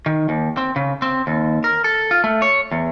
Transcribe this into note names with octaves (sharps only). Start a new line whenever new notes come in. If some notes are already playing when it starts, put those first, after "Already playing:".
D#3
D#2
C4
C#3
C4
D#2
A#4
A4
F4
A3
C#5
E2